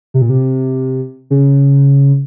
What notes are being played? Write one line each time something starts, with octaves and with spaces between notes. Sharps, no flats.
C3
A#2
C3
C#3